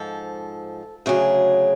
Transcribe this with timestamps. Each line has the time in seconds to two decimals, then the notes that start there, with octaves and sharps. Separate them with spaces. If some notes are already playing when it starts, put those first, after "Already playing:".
Already playing: G#2 F3 A4
1.06 D2 C#3 F#3 G#4